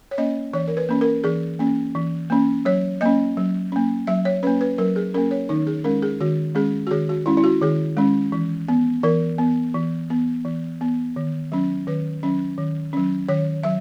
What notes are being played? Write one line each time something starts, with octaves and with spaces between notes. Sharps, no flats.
C#5
A#3 C#4 D#5
E3 C#5
A#4
B4
A#3 C#4
A#4
E3 G#4
A#3 C#4
E3
A#3 C#4
F#3 C#5
A#3 C#4 D#5
F#3
A#3 C#4
F#3 E5
C#5
A#3 C#4 B4
B4
F#3 A#4
G#4
A#3 C#4 A#4
C#5
D#3 D#4
G#4
G#3 C#4 A#4
G#4
D#3 F#4
G#3 C#4 G#4
F#4
D#3 G#4
F#4
G#3 C#4 E4
E4
F#4
D#3 G#4
G#3 C#4
E3
B3
E3 A#4
B3
E3
B3
E3
B3
D#3
F#3 C#4
D#3 B4
F#3 C#4
D#3
F#3 C#4
D#3 C#5
F#3 E5